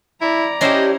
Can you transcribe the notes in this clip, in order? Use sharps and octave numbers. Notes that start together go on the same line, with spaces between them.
E4 D5 A#5
C#4 D4 E4 G4 C5 D#5